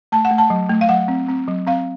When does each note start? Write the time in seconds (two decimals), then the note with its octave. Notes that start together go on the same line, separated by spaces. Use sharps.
0.12 A3 A5
0.25 F#5
0.31 A3
0.38 A5
0.50 F#3
0.69 A3
0.81 F5
0.89 F#3 F#5
1.08 C4
1.29 C4
1.48 F#3
1.67 C4 F5